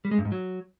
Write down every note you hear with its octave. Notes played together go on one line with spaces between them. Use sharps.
G3
G#3
G2
G#2
F#3